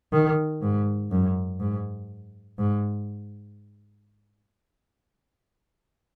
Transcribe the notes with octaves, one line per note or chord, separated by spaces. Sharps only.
D#3
G#2
F#2
G#2
G#2